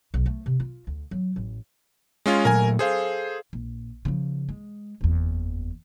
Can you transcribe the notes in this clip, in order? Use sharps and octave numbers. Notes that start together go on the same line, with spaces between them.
B1
A3
C3
F4
D2
F#3
A1
G#3 C#4 F4
A#2 F#3 A3 A#4 G#5
G#4 A4 C5 F5
A#1
C#3 F3
G#3
F#1 E2